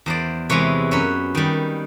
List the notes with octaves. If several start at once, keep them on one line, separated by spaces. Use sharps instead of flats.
E2 C5 D5
C3 E3 G#3 B4 C#5
F#2 B4 C#5
D#3 G3